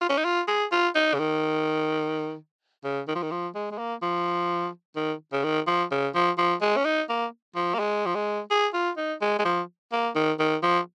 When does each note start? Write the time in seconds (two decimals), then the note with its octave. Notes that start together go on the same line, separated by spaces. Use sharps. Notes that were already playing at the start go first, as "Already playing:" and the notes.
0.01 F4
0.09 C#4
0.18 D#4
0.25 F4
0.48 G#4
0.72 F4
0.95 D#4
1.14 C#3
1.19 D#3
2.84 C#3
3.08 D#3
3.15 F3
3.22 D#3
3.31 F3
3.55 G#3
3.71 G#3
3.78 A#3
4.02 F3
4.96 D#3
5.33 C#3
5.44 D#3
5.67 F3
5.92 C#3
6.15 F3
6.38 F3
6.62 G#3
6.77 C#4
6.85 D#4
7.09 A#3
7.56 F3
7.74 A#3
7.79 G#3
8.06 F3
8.15 G#3
8.51 G#4
8.74 F4
8.97 D#4
9.21 G#3
9.39 G#3
9.45 F3
9.92 A#3
10.15 D#3
10.39 D#3
10.63 F3